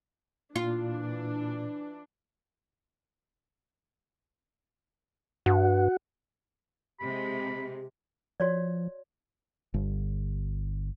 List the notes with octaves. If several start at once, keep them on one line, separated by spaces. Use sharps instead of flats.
A#2 E3 D4 F4
G2 F#4 F#5
C3 G#3 G4 B5
F3 F#4 C#5 D5
G1